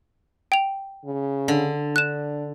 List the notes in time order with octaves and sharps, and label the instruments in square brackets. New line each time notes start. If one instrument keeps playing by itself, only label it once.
[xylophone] G5 F7
[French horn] C#3
[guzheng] D3
[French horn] D4 [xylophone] F#6 E7